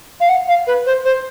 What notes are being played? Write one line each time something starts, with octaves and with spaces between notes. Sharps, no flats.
F5
F#5
F5
B4
C5
C5